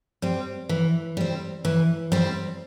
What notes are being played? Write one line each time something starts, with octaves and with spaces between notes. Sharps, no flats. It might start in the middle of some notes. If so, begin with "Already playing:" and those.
G3 C4
E3
G3 C4
E3
G3 C4